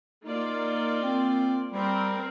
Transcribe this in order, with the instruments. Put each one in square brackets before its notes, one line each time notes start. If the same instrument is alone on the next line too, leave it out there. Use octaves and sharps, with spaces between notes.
[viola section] A#3 F4 D5 [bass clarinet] D#4
[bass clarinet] C4
[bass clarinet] G3 [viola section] C4 A#4